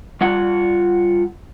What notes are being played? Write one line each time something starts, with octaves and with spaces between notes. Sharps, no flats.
G3 F4 F#5